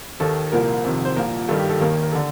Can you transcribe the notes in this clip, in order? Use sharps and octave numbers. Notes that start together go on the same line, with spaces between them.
D#2 D#3 A4
C2 A#2 F3 A#3 A#4
F2 C3 D#3
C5
C2 A#2 F3 A#3 A#4
G2 D#3 A4
G4
A4
D#2 D#3 A#3 A#4
A#4
D3 A4